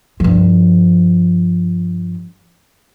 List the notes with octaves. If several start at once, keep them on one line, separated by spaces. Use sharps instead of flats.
G2 F3